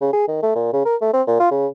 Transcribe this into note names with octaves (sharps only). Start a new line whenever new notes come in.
C#3
G#4
D#3
A3
A#2
C#3
A#4
A3
C4
A#2
F4
C#3